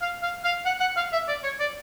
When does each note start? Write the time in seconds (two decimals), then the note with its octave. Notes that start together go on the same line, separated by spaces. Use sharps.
0.01 F5
0.23 F5
0.44 F5
0.65 F#5
0.80 F#5
0.96 F5
1.12 E5
1.28 D5
1.43 C#5
1.60 D5